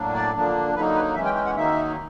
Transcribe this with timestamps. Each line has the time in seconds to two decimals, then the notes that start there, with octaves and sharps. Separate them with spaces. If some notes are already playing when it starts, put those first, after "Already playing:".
Already playing: A2 F#3 A#3 D4
0.14 D5
0.34 D3 F3 A#3 D4
0.75 D3 F#3 A#3 D#4 B4
0.95 B4
1.15 E3 G#3 C#4 E5
1.25 G5
1.35 G5
1.46 F#5
1.56 D#3 F#3 A#3 D#4 E5